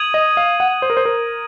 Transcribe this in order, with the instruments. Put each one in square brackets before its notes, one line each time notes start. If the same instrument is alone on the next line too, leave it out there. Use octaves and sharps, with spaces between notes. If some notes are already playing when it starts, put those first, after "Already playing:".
Already playing: [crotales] D#6 G#6 D#7 F#7
[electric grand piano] D#5
F5
F#5
C5
A#4
C5
A#4